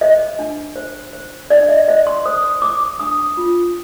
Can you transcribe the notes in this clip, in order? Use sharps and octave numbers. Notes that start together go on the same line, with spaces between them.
C5 D#5
D4
C5
C5
D4 D5
D#5
C5 D#5
C6
C5 D#6
C5 D6
D4 D#6
F4